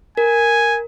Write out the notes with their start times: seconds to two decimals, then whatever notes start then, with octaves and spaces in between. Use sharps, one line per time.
0.17 A#4 G#5